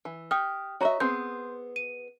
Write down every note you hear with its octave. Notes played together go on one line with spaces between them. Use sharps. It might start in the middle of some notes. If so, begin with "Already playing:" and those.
E3
G4 G5 D#6 F6
F#4 C#5 D#5 E5 A#5
B3 C4 G#4 C6 G6
D#7